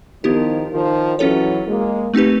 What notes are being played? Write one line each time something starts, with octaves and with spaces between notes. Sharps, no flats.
D#3 F3 B3 E4 G4
D#3 F3
E3 F#3 C#4 F4 A4 C#5
G#3 A#3
A3 C4 D#4 G4 B4